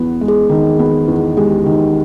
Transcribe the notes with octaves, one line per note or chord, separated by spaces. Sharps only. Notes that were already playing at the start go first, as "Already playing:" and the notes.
Already playing: E2 B3
G#3
G#4
D#3
B3
E2
G#3 G4
D#3